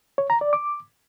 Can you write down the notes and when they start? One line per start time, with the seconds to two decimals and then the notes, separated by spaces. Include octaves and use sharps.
0.18 C#5
0.30 A#5
0.41 D5
0.53 D6